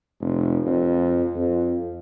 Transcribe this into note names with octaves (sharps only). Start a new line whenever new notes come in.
F1
F2
F2